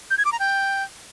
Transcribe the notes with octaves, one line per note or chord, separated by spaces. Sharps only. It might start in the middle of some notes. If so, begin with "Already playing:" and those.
G6
G#6
D6
A#5
G5